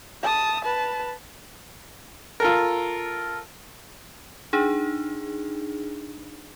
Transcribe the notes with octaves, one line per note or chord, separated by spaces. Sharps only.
A5 D#6
B4 A5
F4 A4 A#4
D4 D#4 G#4